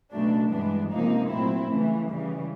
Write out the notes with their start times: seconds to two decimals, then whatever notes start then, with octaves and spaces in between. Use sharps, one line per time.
0.11 C#2 B2 F#3 A3 D4
0.51 G2 E3 G#3 B3 D4
0.91 C#2 C3 F3 A#3 D#4
1.30 A#2 F#3 A3 C4 E4
1.69 C#2 C#3 E3 A3
2.09 C#3 E3 G3